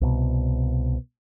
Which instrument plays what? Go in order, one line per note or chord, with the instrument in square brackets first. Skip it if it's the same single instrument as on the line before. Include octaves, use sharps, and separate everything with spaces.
[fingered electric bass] C2 B2